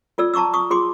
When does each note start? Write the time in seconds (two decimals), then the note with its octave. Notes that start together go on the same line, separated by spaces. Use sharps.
0.18 F4 A4 D5 E6
0.34 A5 A#5 C#6 D6 E6
0.54 C#6 D#6
0.70 F4 G#4 C6 D6